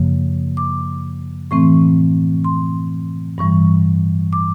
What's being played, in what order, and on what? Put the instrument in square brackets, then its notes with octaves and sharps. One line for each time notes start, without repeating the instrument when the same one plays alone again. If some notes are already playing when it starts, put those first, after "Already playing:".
Already playing: [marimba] F#2 C#3 F3 A#3
D6
A2 E3 A3 C4 C#6
C6
G2 E3 G3 C#6
D6